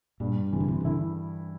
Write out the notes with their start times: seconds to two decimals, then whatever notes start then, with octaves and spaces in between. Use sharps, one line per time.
0.20 G2 A#2
0.53 C3 E3
0.60 D3
0.68 C3
0.81 C3
0.85 D3 E4